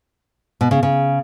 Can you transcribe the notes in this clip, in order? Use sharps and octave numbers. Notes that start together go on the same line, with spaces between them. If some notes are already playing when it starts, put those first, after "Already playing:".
B2
C#3
C#3